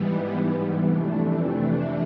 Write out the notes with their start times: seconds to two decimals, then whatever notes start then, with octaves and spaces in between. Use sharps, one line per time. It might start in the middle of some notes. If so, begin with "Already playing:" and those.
Already playing: G#2 E3 G3 B3
0.81 F2 C3 E3 A3 D4